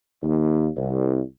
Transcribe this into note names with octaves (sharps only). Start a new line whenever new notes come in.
D#2
C2